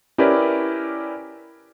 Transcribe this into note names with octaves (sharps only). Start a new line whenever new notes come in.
C#4 E4 G4 A#4 B4 D5